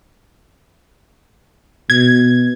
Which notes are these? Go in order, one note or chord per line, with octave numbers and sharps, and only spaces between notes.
B2 G#6